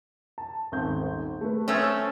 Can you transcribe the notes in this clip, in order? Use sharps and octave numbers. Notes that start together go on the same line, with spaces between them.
A5
D#1 G#1 G6
A3 B4
A3 C4 C#4 D#6 E6 A6